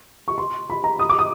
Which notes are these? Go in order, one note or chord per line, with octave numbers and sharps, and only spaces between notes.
C#6
C6
B5
A#5
D#6
D6
D#6